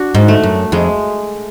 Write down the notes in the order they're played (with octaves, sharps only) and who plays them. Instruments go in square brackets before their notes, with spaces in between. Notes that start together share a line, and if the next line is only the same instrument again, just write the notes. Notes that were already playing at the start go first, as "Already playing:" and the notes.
Already playing: [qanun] D4 F#4
[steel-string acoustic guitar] G#2
[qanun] A3
[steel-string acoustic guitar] F#2
[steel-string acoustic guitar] F2 [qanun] G#3